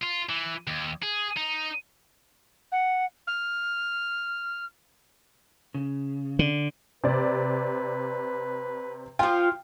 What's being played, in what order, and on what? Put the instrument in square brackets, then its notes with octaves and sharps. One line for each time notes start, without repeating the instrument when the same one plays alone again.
[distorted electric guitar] F4
E3
D#2
G#4
D#4
[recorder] F#5
F6
[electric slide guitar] C#3
[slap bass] D3
[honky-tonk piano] C3 D5 [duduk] B4
[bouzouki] F3 F4 [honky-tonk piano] G5